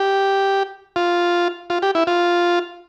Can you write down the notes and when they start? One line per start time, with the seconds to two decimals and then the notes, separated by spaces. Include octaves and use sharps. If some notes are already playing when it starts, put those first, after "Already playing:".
Already playing: G4
0.96 F4
1.70 F4
1.82 G4
1.95 E4
2.07 F4